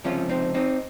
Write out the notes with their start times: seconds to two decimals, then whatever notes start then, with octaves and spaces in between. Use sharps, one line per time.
0.04 C#2 C3 F3 C#4 F4
0.29 C4 D#4
0.54 C4 D#4